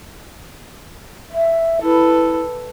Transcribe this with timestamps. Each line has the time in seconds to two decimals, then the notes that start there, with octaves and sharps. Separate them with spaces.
1.30 E5
1.82 E4 A4 B4